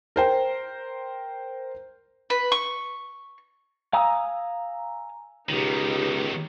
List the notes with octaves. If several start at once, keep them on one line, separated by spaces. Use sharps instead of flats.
A#4 C5 G5
B4
C#6
F5 G#5 A#5 D#6 E6
C#2 B2 D#3 D#4 G4